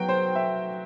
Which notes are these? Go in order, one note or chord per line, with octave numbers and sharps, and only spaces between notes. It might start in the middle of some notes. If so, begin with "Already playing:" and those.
Already playing: F#3 B3 F#4 G5
C5
E5